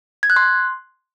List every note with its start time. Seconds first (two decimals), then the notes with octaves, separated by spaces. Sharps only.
0.23 G#6
0.30 F#6
0.36 C6